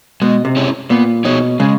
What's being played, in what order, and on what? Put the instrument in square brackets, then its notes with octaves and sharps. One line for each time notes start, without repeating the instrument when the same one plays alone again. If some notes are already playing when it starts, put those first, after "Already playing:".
[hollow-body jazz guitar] B2 [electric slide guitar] G#3
[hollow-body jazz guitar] C3
[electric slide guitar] C#4 E4 G#4 C#5
[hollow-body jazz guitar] A#2 [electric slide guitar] B3
[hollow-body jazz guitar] B2 [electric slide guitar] D#4 G#4 C#5
[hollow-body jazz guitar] C#3 [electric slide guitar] G#3